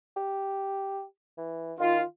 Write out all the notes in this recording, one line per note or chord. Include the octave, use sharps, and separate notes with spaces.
G4
E3
D#3 F4